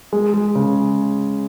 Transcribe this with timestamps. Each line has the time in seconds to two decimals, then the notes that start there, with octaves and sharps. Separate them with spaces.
0.13 G#3
0.34 G#3
0.55 C#3